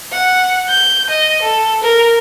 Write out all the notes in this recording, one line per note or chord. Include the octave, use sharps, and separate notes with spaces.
F#5
G6
D#5
A4
A#4